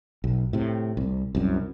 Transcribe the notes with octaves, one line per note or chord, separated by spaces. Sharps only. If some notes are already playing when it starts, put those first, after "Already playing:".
B1
A2 C3
C2
C2 F#2